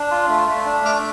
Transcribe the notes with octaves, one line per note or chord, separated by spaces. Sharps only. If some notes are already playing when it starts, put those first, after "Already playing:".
Already playing: D4
F4
A3
A3
D4
A3 D6 F6